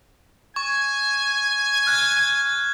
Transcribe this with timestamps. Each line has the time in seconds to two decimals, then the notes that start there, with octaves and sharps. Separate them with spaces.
0.56 G#5 C#6
1.87 F6 F#6 G#6